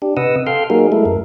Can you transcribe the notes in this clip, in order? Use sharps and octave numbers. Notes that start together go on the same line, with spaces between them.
D4 G4
C3 B4 D#5 F#5 D#6 E6
A4 F5 G5 C6 F6
F#3 A#3 D#4 F#4 G#4 A#4
G#3 A3 E4 A4
F#2 A#4